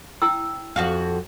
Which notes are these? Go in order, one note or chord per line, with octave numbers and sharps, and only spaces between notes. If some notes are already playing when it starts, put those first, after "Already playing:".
E4 G5 E6
F2 F#4 F5